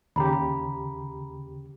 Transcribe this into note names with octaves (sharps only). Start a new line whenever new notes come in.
D#2 C#3 G4 A#5 B5